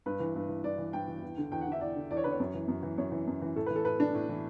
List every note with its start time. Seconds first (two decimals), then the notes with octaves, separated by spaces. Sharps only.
0.06 G2 B4
0.20 E3
0.35 G2
0.49 E3
0.63 G2 D5
0.78 E3
0.93 G2 G5
1.08 E3
1.22 E2
1.38 D3
1.52 E2 G5
1.61 F#5
1.67 D3 E5
1.80 E2 D5
1.96 D3
2.11 E2 D5
2.17 C#5
2.24 D3 B4
2.32 C#5
2.40 F#2
2.54 E3
2.68 F#2
2.83 E3
2.98 F#2 C#5
3.12 E3
3.27 F#2
3.42 E3
3.56 A2 A4
3.66 B4
3.70 E3
3.76 A4
3.85 A2 B4
4.00 E3 D4
4.15 A2
4.29 E3